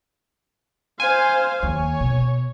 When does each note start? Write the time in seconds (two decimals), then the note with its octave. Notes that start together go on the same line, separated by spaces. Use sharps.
1.00 C5 F5 G#5
1.63 D#2 C#5
2.00 B2